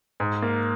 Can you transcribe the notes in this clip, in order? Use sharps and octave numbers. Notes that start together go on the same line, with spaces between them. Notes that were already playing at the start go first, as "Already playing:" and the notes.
G#2
A#3